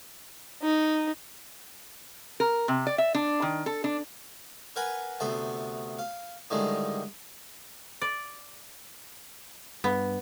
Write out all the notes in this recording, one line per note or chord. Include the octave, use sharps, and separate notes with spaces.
D#4
A#4
C3
D5
E5
D4
D#3
A4
D4
A#4 B4 F#5 G#5 A#5
D2 C3 A3 B3 F#5
F5
A2 D3 D#3 G3 G#3
D5
G2 B3